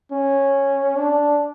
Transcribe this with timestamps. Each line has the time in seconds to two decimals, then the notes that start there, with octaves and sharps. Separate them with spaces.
0.12 C#4
0.95 D4